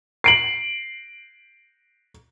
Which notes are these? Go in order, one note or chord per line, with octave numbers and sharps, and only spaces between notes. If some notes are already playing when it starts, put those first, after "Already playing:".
C7 D7 F#7